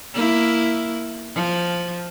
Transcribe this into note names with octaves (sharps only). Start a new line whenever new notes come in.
A#3 E4
F3